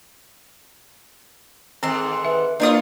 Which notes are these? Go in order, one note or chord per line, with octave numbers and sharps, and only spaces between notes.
G#2 D#3 C4 A4 C6
B4 E5
A#3 D4 E4 F4 C5 C#5 D#6